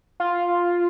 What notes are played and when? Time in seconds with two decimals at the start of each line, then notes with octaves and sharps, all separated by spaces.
0.20 F4